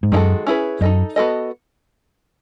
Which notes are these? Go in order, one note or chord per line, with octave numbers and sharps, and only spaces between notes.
G#2
F#2 D#3 G#3 D#4 F#4 A4
C#4 E4 G#4 B4
F#2 D#4 A4 D#5
B3 F#4 A4 D#5